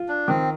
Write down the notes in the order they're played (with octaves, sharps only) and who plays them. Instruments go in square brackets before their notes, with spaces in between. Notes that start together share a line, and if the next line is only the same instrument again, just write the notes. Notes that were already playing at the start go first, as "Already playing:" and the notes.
Already playing: [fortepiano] F4
[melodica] D4
[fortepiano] D#3 [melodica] C4